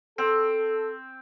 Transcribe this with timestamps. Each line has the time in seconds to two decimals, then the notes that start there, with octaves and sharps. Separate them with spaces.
0.18 C4 A4